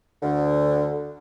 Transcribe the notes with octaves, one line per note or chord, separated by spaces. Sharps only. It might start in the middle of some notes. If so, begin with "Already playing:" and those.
D2 D3